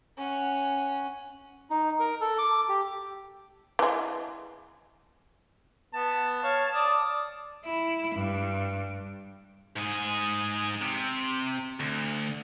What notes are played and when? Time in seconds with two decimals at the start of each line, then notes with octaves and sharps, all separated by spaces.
0.18 C#4 F#5
1.70 D#4
2.00 A#4
2.21 A4
2.38 D6
2.69 G4
3.79 E3 G#3
5.94 B3 A5
6.43 C#5 F5
6.74 D5 D#6
7.65 E4
8.15 G2
9.77 G#2 G#4
10.82 C3
11.80 D2